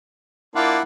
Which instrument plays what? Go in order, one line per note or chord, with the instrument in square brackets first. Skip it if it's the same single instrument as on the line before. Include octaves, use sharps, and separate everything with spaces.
[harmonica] A#3 D4 F4 [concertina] E4 F#5